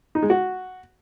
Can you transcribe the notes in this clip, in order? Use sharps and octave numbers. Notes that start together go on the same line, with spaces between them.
D#4
G#3
F#4